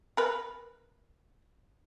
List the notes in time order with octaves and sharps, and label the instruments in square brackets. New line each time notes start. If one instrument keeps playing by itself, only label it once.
[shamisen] A#4 B4